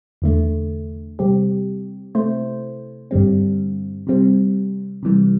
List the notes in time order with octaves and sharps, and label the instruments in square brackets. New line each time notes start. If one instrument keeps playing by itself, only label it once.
[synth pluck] E2 D3 A3
C3 G3 C4 G4
C3 A3 E4 C5
G2 D3 G3 C4
C3 G3 C4
C3 E3 G3